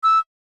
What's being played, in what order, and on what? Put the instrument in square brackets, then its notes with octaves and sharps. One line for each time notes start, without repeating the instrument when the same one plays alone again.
[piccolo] E6